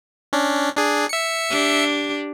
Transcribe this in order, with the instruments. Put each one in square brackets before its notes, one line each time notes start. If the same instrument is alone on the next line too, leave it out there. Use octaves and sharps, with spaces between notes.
[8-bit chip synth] C#4 D4
D4 G#4
E5 C#7
[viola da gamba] D4 G4